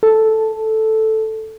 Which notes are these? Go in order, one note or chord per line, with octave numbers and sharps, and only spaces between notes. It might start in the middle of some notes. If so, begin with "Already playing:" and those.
A4